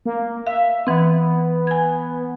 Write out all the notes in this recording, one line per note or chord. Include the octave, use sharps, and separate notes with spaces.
A#3
E5 F5
E3 B3 C4
G#5 G#6